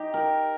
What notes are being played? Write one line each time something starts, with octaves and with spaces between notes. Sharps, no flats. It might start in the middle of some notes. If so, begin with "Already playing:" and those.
Already playing: D#4 G4
A#4